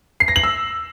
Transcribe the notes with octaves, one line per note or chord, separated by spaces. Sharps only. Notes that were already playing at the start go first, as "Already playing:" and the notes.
C7
A#6
F#7
E6